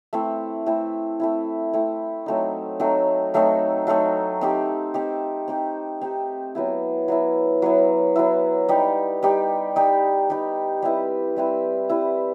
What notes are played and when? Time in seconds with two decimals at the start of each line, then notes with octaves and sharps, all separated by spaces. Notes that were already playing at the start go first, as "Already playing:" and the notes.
0.13 A3 C4 E4
0.66 A3 C4 E4
1.20 A3 C4 E4
1.73 A3 C4 E4
2.26 F#3 A3 C4 D#4
2.80 F#3 A3 C4 D#4
3.34 F#3 A3 C4 D#4
3.87 F#3 A3 C4 D#4
4.41 C4 D#4 G4
4.94 C4 D#4 G4
5.48 C4 D#4 G4
6.01 C4 D#4 G4
6.55 F#3 B3 E4
7.08 F#3 B3 E4
7.62 F#3 B3 E4
8.16 F#3 B3 E4
8.69 G3 D#4 G4
9.23 G3 D#4 G4
9.76 G3 D#4 G4
10.30 G3 D#4 G4
10.82 G3 C4 E4 B4
11.36 G3 C4 E4 B4
11.89 G3 C4 E4 B4